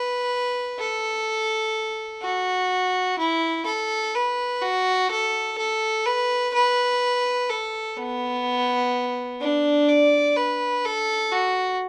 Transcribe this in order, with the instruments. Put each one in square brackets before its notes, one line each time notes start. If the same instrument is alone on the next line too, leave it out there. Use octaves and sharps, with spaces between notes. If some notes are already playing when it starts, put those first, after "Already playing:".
Already playing: [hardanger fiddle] B4
A4
F#4
E4
A4
B4
F#4
A4
A4
B4
B4
A4
B3
D4
D5
B4
A4
F#4